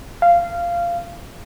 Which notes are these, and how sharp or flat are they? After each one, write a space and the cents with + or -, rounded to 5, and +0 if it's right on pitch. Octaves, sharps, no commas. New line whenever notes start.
F5 -15